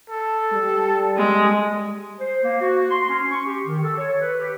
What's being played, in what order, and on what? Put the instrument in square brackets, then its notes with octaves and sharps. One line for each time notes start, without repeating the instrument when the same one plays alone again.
[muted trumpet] A4
[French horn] G3
[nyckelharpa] G#3
[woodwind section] C5
A#3
F#4
C6
C#4
C#6
G4
D#3
A4
C#5
B4
G4